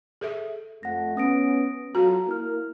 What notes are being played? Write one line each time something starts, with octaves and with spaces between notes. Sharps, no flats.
G#4 A4 E5
F2 A3 F#5 A#6
B3 C#4 D#6 A#6 D7
F#3 F4 F#4 A4 A#5
A#3 E4 F6